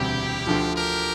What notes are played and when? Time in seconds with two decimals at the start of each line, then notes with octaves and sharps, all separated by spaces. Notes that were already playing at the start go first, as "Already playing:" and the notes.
Already playing: E1 D2 C3 G3 E4 G4
0.47 D2 D3 F3
0.76 G4 A#4